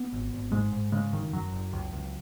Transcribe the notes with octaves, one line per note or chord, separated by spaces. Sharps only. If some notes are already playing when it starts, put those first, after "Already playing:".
Already playing: B3
G#1
G#1
G#2 G#3
G#2
C#3 G#3
F#1 D#3
F#2 F#3
F#1
C#2
C#2